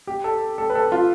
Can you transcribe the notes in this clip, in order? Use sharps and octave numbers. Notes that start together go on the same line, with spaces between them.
G4
A4
A4
B4
A4
F4